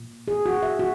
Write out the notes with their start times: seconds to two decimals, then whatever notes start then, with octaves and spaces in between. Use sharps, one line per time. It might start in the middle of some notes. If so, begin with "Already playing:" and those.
Already playing: A#2
0.28 G#4
0.46 F#4
0.63 E5
0.79 F#4